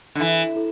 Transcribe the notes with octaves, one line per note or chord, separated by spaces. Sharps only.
D3
E3 E4 A4 E5
E4 A4